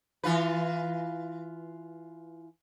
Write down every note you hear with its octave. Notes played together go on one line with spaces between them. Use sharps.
E3 F4 B4